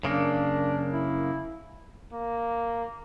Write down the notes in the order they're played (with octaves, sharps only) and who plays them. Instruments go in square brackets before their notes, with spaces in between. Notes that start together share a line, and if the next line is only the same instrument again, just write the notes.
[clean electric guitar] F#2 C#3 A#3 [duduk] D4
[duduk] E4
[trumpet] A#3